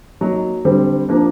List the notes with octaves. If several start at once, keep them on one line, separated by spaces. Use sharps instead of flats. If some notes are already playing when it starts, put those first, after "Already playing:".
F#3 A#3 D#4
D3 G3 C4
F3 A#3 D4